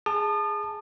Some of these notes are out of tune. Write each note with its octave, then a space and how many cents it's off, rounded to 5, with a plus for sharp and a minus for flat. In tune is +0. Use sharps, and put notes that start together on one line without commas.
G#4 +0 A5 +0 D#6 -40